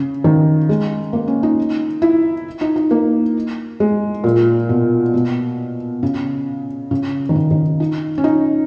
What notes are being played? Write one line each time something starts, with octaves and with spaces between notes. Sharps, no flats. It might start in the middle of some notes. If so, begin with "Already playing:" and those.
Already playing: C#3
D#3
G#3
A#3
C#4
D#4
E4
D#4
D#4
A#3
G#3
A#2
B2
B2
C#3
C#3
D#3
C#3
D#3
D#4
C#4
D#4